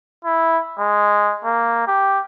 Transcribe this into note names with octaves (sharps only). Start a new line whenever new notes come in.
E4
G#3
A#3
G4